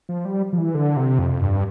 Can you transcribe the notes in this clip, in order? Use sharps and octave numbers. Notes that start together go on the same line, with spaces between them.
F3
G3
F3
E3
D3
C3
F2
G2